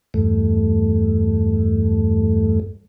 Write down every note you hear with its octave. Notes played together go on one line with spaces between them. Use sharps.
E2 G2 A3